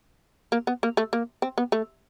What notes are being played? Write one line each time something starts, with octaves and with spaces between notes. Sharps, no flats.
A#3
B3
A#3
A3
A#3
C4
B3
A3